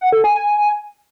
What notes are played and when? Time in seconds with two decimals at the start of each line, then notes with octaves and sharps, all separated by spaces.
0.01 F#5
0.12 A4
0.24 G#5
0.35 G#5